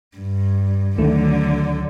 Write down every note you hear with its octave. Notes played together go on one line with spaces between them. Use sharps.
G2
D2 D3 D#3 F#3 A3